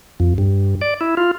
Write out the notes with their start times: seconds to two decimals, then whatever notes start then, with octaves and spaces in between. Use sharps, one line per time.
0.20 F2
0.38 G2
0.81 D5
1.01 E4
1.17 F4